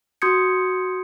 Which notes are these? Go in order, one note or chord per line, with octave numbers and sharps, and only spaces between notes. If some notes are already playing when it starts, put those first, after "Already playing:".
F#4 C6 D#6 G6 G#6 C#7